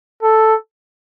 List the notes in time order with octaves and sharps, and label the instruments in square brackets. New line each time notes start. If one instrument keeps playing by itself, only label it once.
[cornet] A4